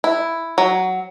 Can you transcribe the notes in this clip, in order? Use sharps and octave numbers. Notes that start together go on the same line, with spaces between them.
E4
F#3